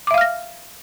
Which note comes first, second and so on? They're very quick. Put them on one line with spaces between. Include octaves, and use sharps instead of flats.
D6 E5 F5 F6 A#6